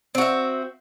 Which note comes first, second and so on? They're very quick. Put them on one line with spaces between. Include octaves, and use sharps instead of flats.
C4 F#4 E5